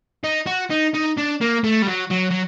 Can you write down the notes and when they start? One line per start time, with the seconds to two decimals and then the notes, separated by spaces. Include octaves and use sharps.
0.24 D#4
0.46 F#4
0.70 D#4
0.94 D#4
1.17 D4
1.41 A#3
1.64 A3
1.82 G3
1.87 F#3
2.11 F#3
2.31 F#3